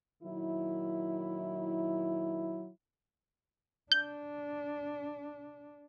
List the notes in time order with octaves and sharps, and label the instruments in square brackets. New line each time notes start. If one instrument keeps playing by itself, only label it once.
[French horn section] A#2 D#3 F#3 E4
[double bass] D4 [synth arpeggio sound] G6